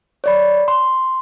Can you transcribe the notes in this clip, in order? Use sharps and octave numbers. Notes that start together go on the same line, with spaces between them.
C#5 D5 B5
C6